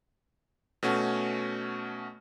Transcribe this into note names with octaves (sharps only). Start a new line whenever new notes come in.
B2 A3 C#4 F#4